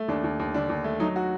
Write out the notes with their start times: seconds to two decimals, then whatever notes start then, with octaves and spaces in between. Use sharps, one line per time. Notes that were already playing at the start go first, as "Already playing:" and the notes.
Already playing: A3
0.08 D#2 D4
0.24 D#2
0.39 D#2
0.54 D3 D4
0.69 D#2
0.84 A3
0.99 F#3 D#4
1.16 F#4